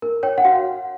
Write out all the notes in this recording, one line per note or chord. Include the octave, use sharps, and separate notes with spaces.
A#4
C#5 G5
F#5
F#4 F5